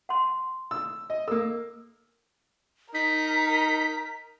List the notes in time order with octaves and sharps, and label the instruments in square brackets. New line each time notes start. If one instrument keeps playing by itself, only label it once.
[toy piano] F#5 C6
[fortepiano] E6
D#5
[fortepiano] A#3 E6 [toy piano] A4 A#4
[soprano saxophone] D#4 [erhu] A#4 [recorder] B6